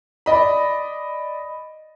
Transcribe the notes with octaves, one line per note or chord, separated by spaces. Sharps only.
D5 D#5 B5